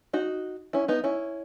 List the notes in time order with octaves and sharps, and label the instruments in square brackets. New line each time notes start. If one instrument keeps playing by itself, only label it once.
[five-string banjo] D#4 F#4
C#4 E4
B3 D#4
C#4 E4